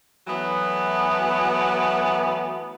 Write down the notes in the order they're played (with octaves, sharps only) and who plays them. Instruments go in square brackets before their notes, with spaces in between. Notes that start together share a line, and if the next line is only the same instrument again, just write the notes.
[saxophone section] E3 F#3 A3 B3